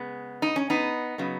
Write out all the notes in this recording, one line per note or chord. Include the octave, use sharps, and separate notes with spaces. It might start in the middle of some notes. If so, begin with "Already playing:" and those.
Already playing: C#3 G#3 B3
D#4
C#4
B3 D#4
C#3 F#3 B3